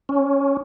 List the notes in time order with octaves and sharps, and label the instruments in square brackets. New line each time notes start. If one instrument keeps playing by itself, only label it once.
[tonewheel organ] C#4